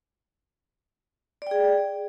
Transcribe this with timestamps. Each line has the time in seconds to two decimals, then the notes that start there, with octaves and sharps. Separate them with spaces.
1.42 D5
1.47 G5
1.51 G#4